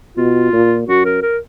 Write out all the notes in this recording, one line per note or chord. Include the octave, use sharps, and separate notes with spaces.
B2 F4
A#2
F#2 F#4
A#4
A#4